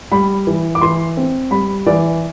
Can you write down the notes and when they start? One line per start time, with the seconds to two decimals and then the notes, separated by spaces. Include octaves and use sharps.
0.12 G3 B5
0.47 E3
0.75 D6
0.81 E3 C6
1.17 C4
1.51 G3 B5
1.87 E3 D5